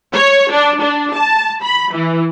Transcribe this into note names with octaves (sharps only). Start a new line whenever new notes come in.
C#5
D4
D4
A5
B5
E3